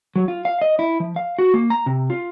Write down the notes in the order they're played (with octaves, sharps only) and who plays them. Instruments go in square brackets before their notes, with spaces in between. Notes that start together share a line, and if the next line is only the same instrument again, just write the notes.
[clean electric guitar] F#3
F4
F5
D#5
E4
F3
F5
F#4
A#3
A#5
C3
F4